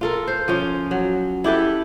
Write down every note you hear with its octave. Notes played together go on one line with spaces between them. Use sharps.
F4 A4 A#4
C5
F3 C#4 F4
F#3
E4 G4 A4 B4